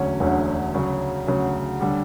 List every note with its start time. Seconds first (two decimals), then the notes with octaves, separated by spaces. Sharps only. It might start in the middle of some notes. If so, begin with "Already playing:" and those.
Already playing: E1 D2 D3 F#3 C#4
0.20 E1 D2 D3 F#3 C#4
0.74 D2 C#3 F#3
1.27 D2 C#3 F#3
1.81 D3 G3